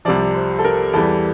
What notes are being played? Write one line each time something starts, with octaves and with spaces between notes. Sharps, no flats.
C2 C3 F3 D5
C5
A4
A#4
E2 E3 G3 A4